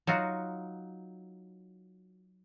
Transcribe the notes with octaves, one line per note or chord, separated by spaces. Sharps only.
F#3 D#4 F4 F#4